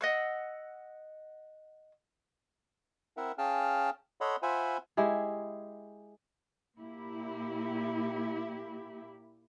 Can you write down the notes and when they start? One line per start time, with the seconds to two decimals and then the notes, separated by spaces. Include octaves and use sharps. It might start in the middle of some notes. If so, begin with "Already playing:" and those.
0.01 D#5 F#5 E6
3.17 C4 E4 A#4 E5 F#5
3.38 C#4 G#4 F5 G5 A5 F6
4.21 A4 C#5 D#5 F#5 B5 C6
4.42 F4 C5 E5 F#5 G#5 B5
4.97 G#3 E4 G4 G#4
6.78 A#2 A#3 E4 G4